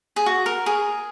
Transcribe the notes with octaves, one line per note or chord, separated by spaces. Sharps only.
G#4
F#4
A#4
G#4